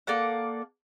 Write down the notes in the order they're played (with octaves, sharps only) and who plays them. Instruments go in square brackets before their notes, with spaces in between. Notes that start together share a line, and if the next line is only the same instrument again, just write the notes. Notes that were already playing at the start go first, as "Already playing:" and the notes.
[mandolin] A#3 A4 D5 F#5